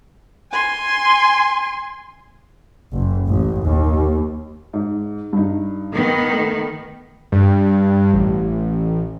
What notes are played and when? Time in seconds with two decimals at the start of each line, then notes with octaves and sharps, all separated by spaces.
0.52 G#5 C6
2.92 F#1
3.27 A1
3.63 D#2
4.73 G#2
5.33 G2 D#4
5.92 D#3 B3
6.32 A3
7.32 G2
8.14 A1